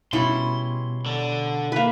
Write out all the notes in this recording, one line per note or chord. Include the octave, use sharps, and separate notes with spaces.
B2 G3 C#4 E4 C6
D3
A#3 B4